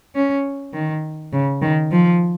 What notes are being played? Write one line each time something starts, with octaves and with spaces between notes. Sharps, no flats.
C#4
D#3
C#3
D#3
F3